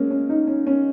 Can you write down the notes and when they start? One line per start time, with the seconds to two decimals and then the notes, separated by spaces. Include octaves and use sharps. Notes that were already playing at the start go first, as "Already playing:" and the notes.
Already playing: G#3 A#3 C#4
0.10 C#4
0.29 D#4
0.47 C#4
0.67 C#4